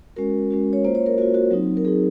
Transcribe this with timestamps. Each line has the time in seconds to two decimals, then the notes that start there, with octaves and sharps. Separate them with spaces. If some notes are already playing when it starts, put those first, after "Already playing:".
0.16 G#3 C#4 F#4 A#4
0.50 G#3 C#4 F#4
0.73 C#5
0.85 A#3 F4 C5
0.95 C#5
1.06 A#4
1.18 A#3 F#4
1.22 F4
1.34 F#4
1.51 F#3 C4 D#4
1.77 A#4
1.85 F#3 C4 D#4 G#4